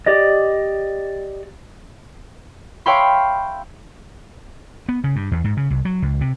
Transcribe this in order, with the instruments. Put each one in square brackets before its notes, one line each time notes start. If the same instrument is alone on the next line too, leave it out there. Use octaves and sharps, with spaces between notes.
[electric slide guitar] G4 D5 D#5
[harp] C#5 E5 F5 G5 B5 C6
[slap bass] B3
C#3
G2
E2
G#2
C#3
C2
F#3
C#2
C3